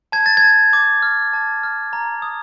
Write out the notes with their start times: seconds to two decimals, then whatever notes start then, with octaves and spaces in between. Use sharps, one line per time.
0.12 A5 G#6
0.26 A6
0.37 G#6
0.43 A5
0.73 D6
1.02 F6
1.33 A5
1.63 F6
1.93 A#5
2.22 D#6